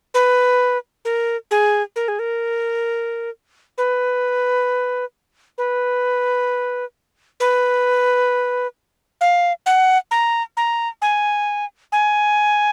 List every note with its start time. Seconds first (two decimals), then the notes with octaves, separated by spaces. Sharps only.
0.14 B4
1.05 A#4
1.51 G#4
1.96 A#4
2.08 G#4
2.19 A#4
3.78 B4
5.58 B4
7.40 B4
9.21 F5
9.66 F#5
10.11 A#5
10.57 A#5
11.01 G#5
11.92 G#5